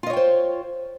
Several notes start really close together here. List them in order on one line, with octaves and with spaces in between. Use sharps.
F4 D#5 C#5 G5 C5